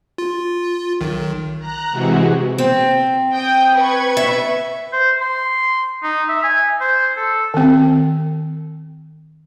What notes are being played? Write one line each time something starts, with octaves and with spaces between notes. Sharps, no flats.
F4
B1 D#3
A#5 F#6
C3 E3 G#3 F#4
C4
G5 D#6
B4 C#6 G#6
E5
C5
C6
D#4
E5
G#5
C5
A4
D#3 C4